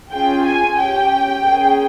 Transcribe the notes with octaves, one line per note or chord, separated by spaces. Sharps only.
C#4 F4 G#4 G5
G#5
C#4 G4 G5
A#3 C#4 G#4